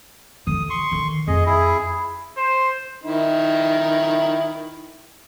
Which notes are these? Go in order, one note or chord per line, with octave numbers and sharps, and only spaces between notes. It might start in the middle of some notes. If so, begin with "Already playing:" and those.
D3 E3 D#6
C6 C#6
D3 D#3
F2 G#4 D#5
E4 G#4
C5
D#3 E4